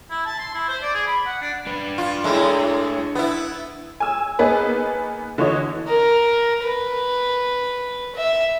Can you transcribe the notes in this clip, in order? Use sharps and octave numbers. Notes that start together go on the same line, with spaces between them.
E4
A5
C6
E4
C5
D5
G#4
B5
F#5
D4
D4 B4
F4
A2 G#3 E4
B3 E4
G#5 E6
A#3 B3 D#4 G#4 B4
D3 E3 F#4 C#5 D#5
A#4
B4
E5